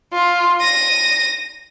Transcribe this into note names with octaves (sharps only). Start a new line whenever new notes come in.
F4
A#6 D#7